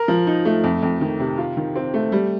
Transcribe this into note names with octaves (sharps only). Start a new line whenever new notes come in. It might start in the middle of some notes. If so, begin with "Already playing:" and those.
Already playing: A#4
F3
D#4
A3
F2
F2
D#3
C3
F4
D#3
C4
A3
G3